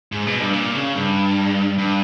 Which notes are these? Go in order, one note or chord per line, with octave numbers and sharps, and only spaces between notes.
G#2
B2
G2
A#2
C#3
G2
G2